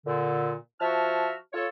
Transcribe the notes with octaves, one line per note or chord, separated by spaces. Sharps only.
A#2 D3
F3 F#4 E5 A5 F6
F4 A4 C#5